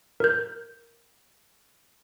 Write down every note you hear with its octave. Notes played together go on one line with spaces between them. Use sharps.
A#4 G6